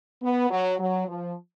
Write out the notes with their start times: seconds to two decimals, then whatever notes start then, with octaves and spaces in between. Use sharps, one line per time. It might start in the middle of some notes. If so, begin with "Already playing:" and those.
0.22 B3
0.50 F#3
0.79 F#3
1.08 F3